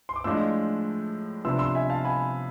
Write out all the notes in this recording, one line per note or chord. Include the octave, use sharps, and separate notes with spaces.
C6
D6
A2 F3 G#3 D4 F4 C6 E6
C3 F3 B3 D4 C6 E6
C6 E6
E5 G#5
F5 A5
G#5 B5